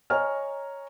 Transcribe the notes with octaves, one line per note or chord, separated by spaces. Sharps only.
C#5 D#5 G#5 A#5 F6